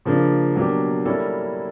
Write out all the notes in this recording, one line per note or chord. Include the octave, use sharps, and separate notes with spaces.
C#3 F3 A#3 D4
B2 F#3 A#3 D4 G4
G3 A#3 C#4 E4 A4